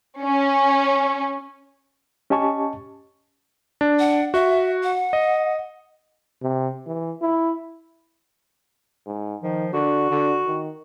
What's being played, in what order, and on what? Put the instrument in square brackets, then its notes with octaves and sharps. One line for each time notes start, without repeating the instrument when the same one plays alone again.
[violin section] C#4
[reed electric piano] C#4 G4 D#5 G#5 A5 C#6
[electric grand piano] D4
[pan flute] F#5
[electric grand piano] F#4 [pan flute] E5
[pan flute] F#5
[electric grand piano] D#5
[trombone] C3
E3
E4
[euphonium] G#2
[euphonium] D#3 [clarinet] F3
[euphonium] D3 [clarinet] F#4
[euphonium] D3
D#3